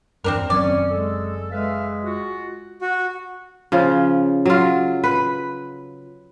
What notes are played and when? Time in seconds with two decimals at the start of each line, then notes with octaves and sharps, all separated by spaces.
0.24 E2 G2 C4 D4 A#4
0.50 F#1 D#3 F#3 C4 C#4 D5
0.90 G#3 A4 E6
1.52 G#3 B4 E5 F5
2.03 F4 F#4
2.81 F#4
3.72 C#3 F3
4.45 F#3 F4
5.04 B4